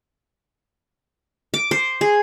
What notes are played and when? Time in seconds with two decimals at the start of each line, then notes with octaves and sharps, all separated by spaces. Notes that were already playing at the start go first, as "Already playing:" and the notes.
1.54 D6
1.71 C5
2.01 G#4